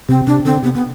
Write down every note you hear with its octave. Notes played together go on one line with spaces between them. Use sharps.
C3 C4
C3 D4
D3 C4
C3 B3
B3